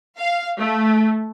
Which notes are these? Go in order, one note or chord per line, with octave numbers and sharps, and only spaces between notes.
F5
A3